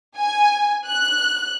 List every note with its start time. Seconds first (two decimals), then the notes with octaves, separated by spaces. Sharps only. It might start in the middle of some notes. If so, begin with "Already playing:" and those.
0.17 G#5
0.87 F#6